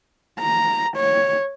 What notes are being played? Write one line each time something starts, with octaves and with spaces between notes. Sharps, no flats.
A#5
C#5